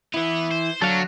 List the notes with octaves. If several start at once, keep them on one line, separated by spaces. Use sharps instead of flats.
E3 B3 E4
C5
D2 F#3 D4 A4 F5